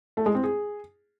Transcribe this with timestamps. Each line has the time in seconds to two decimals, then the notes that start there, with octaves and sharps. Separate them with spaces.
0.17 A3
0.26 G#3
0.35 C4
0.44 G#4